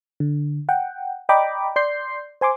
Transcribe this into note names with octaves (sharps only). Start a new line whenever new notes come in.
D3
F#5 G5
D5 D#5 G5 A#5 B5 D6
D5 C6 G6 C7
C5 G#5 C6 D6